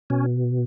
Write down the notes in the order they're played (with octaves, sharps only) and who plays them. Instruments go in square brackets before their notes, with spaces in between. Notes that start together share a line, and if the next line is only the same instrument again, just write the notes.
[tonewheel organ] B2 C#4